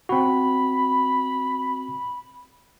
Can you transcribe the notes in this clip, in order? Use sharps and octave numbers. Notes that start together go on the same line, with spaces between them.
C4 F#4 B5